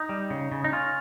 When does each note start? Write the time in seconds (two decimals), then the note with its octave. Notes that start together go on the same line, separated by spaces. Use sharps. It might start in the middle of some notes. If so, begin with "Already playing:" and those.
Already playing: D#4
0.09 G3
0.30 C#3
0.52 C#3
0.64 D#4
0.73 C#4 F4